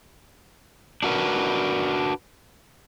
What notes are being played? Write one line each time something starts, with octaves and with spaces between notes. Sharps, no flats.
D4 F#4 A#4 B4